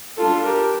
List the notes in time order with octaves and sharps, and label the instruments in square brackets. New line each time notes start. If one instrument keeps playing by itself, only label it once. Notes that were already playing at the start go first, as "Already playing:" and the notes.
[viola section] G3 D4 F4 A4
G4 A#4